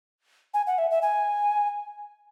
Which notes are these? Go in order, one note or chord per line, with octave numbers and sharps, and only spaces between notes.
G#5
F#5
E5
E5
G#5